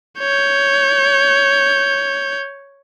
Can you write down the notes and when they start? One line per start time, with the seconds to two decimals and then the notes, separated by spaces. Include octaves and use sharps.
0.19 C#5 G6